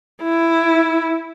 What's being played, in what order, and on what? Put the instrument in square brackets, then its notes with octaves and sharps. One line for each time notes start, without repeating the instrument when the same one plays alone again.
[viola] E4